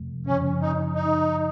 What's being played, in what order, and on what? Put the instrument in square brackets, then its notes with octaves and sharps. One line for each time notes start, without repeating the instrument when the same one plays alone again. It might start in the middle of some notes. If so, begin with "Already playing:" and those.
Already playing: [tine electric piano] F2 C3 F3 A3
[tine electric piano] F#2 C#3 F3 [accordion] C#4
[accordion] D#4
D#4